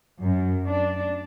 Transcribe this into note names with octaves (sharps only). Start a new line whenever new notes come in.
F#2
D4